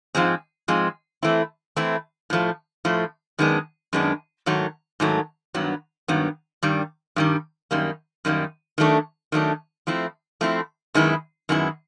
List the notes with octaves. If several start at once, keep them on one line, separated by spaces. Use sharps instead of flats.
G#2 F3 G#3 C4
G#2 F3 G#3 C4
E3 A3 C4 E4
E3 A3 C4 E4
A2 F3 A3
A2 F3 A3
F#2 D#3 G#3 B3 D4
F#2 D#3 G#3 B3 D4
G#2 D#3 F#3 A3
G#2 D#3 F#3 A3
G2 D#3 F#3 B3
G2 D#3 F#3 B3
G2 D#3 G3
G2 D#3 G3
F#2 D#3 G3 A#3
F#2 D#3 G3 A#3
D#3 F#3 A3 D4
D#3 F#3 A3 D4
F3 A3 C4 E4
F3 A3 C4 E4
F#2 D#3 G#3 B3 E4
F#2 D#3 G#3 B3 E4